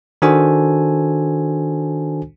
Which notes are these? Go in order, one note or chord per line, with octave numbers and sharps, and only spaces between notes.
D#3 D4 F#4 A4 C5 G#5